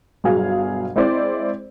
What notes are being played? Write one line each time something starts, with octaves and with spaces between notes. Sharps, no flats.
G1 B2 F#3 G#4 F5
G#3 C4 E4 C5 D5